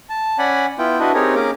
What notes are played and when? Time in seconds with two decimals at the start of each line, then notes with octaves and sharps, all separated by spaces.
0.09 A5
0.38 C#4 D5 F#5 G#5 B5
0.79 B3 E4 F4 G5
1.00 D4 E4 F#4 B4 D#5
1.14 C4 D#4 G4 G#4 A#4 C#5
1.35 A#3 C#4 G#4 A#4 D6